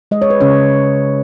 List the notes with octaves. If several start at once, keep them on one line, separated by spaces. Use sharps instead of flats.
G#3 D#5
C#5
B4
C#3 C#4 C#5